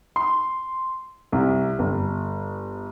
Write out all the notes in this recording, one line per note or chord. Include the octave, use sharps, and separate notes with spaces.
C6
C2
G1